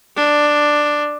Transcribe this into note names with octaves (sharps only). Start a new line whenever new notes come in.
D4